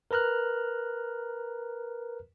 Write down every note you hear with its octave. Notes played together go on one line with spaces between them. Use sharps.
A#4 B4 A#5 F6 F#6